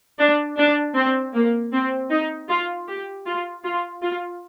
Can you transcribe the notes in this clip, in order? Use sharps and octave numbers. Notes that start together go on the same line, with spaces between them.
D4
D4
C4
A#3
C4
D#4
F4
G4
F4
F4
F4